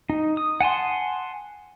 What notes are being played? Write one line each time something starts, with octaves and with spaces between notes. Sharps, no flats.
D#4
D#6
F#5 G#5 A5 C6